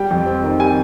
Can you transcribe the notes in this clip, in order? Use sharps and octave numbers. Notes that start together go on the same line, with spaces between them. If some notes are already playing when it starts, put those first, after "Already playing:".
Already playing: G3 G5
F2
C4
D#3
G3 G#5